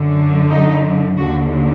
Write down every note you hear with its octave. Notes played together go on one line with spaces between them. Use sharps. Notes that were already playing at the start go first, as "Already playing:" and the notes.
Already playing: F#2 D3
D#4
D#2 D3 F#4